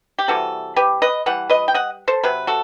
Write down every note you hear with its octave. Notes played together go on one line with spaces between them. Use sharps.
G4
C3 E3 G3 F#4 A4
G4 B4
B4 D#5
E3 G3 F#5
B4 D#5
G5
D#5 F#5
A4 C5
C3 F#3 B4
F#4 A4